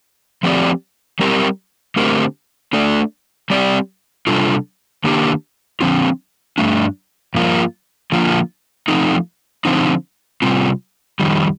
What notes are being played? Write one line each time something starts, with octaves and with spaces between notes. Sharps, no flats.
F3 A3 C4 G4 D5
G3 C4 G4 A#4
D3 A3 C4 G4 A#4
A3 D4 A4 D5
G3 C4 G4 D5
C3 G3 D4 F4 A4
D#3 A#3 D4 G4
D3 F3 C4 F4
G2 D#3 A3 D4
G2 F3 A#3 F4 A#4
D3 F3 A#3 F4
F3 A3 C4 D#4
D3 F3 C4 D#4
C3 G3 C4 F4
F2 D#3 G3